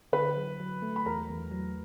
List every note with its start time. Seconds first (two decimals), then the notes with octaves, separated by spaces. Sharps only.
0.13 D3 B4 B5
0.36 F#3
0.60 F#3
0.82 A3
0.96 B5
1.06 E2 A#4 A#5
1.29 E2
1.51 F#3